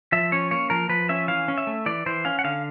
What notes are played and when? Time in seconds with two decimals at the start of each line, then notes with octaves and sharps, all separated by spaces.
0.12 F3 E5
0.32 C#4 C#5
0.51 A#3 C#5
0.70 F3 A#4
0.89 F3 B4
1.09 C#4 E5
1.28 E3 F5
1.48 C#4
1.58 E5
1.67 A3
1.86 E3 D5
2.06 E3 C5
2.25 C#4 F5
2.39 F#5
2.44 D3 F5